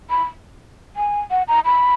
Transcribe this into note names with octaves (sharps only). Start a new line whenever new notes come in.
B5
G#5
F#5
A#5
B5